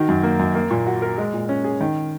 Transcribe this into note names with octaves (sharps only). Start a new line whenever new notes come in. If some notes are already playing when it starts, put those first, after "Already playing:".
Already playing: D#3 F#4
F#2
A#3
F#2
A#3
A#2
F#4
A#4
G#3
A#2
C#4
G#4
D#3